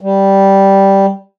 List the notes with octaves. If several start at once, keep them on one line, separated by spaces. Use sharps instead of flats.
G3